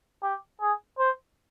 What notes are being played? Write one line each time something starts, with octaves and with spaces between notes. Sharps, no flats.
G4
G#4
C5